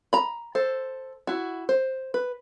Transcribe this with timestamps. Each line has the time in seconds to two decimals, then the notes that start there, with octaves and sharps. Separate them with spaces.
0.13 A#5 B5
0.55 A4 C5
1.27 E4 F#4
1.69 C5
2.14 B4